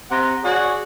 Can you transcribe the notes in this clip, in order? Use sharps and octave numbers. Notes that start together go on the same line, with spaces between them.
C3 F#5 A#5
F#4 G#4 C#5 D5